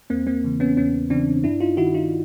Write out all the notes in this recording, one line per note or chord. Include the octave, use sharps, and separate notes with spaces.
E2 A#3 C4
A#3 C4
C#3 E3
B3 C#4
E2 B3 C#4
C#3 E3 C4 D4
G2 D4 E4
D#4 F4
D#3 E4 F#4
D#4 F4